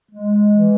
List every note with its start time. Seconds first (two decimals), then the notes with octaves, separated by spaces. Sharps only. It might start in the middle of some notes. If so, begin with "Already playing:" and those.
0.10 G#3
0.50 E3